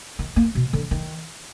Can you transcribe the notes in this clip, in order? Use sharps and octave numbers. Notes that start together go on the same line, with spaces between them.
D#3
A#3
B2
D3
D#3